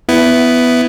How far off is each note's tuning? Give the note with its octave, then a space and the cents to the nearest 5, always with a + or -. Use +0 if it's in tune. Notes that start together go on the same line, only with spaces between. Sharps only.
B3 +10 E4 +0